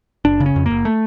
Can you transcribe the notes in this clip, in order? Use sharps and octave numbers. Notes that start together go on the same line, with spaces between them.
F#1 D4
C#3
C#4
F2
F#1 A#3
A3